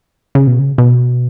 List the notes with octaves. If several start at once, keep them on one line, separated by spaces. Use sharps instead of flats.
C#3
B2
C#3
B2